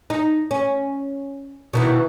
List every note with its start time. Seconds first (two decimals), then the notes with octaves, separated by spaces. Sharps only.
0.10 D#4
0.51 C#4
1.73 B2 D#3 E3